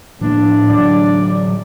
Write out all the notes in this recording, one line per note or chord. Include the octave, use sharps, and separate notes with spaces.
A2 F3 A#3 B3 D4
A2 D3 E3 F#3 D5